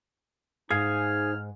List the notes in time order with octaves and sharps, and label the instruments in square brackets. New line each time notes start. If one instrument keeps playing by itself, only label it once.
[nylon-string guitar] G#2 [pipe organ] D#4 C5 [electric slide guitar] G#4 F5 [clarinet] F6